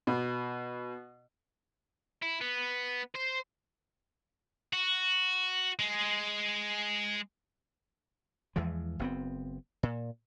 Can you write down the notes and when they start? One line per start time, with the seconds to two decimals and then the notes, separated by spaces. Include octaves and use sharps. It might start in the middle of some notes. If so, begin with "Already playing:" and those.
0.07 B2
2.22 E4
2.41 B3
3.15 C5
4.73 F#4
5.79 G#3
8.56 E2 E3 F3 G#3
8.99 F#1 B3 C4
9.83 A#2